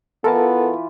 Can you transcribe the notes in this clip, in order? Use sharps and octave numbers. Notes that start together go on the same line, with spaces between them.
E3 B3 E4 F4 A4 A#4 A5